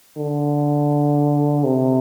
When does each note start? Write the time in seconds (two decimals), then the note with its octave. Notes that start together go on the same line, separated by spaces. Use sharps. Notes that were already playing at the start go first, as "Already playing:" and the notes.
0.17 D3
1.64 C3